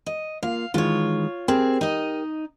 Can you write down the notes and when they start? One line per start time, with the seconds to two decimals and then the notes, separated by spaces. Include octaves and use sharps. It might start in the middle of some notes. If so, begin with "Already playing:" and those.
0.06 D#5
0.43 A#3 F4 F5
0.74 D#3 E3 G#3 F4 C#5
1.48 C4 G4 G#4 A#4 G5
1.81 D#4 D#5